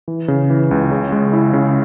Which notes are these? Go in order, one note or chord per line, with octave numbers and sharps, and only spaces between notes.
E3
C#3
E3
C#2
C#3
G#3
E4
C#3